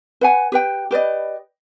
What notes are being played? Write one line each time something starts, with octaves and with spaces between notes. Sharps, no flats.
B4 F#5 G#5
G4 B4 G5
G4 B4 D5 D#5